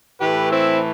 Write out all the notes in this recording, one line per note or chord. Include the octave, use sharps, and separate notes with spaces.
A2 E3 A3 G4 B4
C4 E4